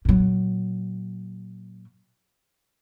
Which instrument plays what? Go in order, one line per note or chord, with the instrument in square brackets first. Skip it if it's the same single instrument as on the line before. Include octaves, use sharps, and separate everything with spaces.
[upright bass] A#2 F#3